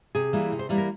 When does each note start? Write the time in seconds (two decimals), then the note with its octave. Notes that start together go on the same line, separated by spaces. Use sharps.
0.15 C3 G#4
0.33 E3 G3 A#3
0.52 C3
0.59 C5
0.69 E3 G3 A#3 B4
0.78 A#4